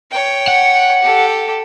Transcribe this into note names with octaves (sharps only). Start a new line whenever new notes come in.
C#5 G5
F#5
G4 A4